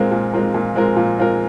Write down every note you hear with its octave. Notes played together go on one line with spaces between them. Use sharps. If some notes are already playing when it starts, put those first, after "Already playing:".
Already playing: A#2 G#3 C4 F4 A#4
A#2
G#3 C4 F4 A#4
A#2
G#3 C4 F4 A#4
A#2
G#3 C4 F4 A#4